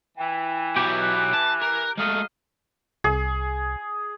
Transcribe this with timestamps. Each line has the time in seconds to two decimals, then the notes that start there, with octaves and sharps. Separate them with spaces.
0.17 E3 G5
0.76 B2 F#3 G4
0.99 F#6
1.33 A5
1.62 A#4
1.97 F#3 G#3 A3 D#5 F5 F6
3.04 C2 G#4